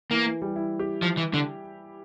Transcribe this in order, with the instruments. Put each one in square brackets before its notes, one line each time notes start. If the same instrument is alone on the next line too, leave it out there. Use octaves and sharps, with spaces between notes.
[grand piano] E3 [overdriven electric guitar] A#3
[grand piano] E3
G3
E4
G4
[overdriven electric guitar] F3
E3
D3